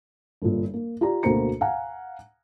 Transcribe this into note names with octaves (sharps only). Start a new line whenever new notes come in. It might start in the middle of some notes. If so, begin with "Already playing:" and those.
G1 A#2
A#3
F4 G4 D5 A#5
D2 B2 A#3 C5 A#5 C#7
F5 F#5 G#5 A#5